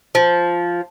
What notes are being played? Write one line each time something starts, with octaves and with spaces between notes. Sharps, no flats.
F3